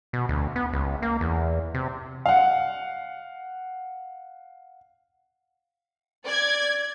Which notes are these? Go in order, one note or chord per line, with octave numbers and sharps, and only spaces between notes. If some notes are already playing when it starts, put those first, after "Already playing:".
B2
D2
B3
C#2
A#3
E2
C3
F5 F#5
D5 G#6